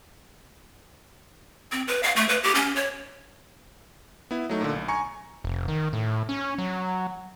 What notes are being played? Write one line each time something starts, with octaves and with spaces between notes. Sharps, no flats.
C4
B4
F5
A3
B4
G4
C#4
C#5
B3 E4
F#3 A3 D#4
A#2 D3
B1
G#5 A#5 C#6 C#7
F1
D#3
A2
C#4
F#3